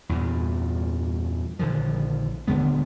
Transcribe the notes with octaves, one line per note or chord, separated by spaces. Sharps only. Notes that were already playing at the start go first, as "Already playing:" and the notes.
E2 G2 A#2
A#1 D3 D#3 F3
D#1 D3 G#3 B3